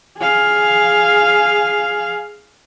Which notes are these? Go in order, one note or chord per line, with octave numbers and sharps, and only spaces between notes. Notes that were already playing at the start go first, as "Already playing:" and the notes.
G#4 F5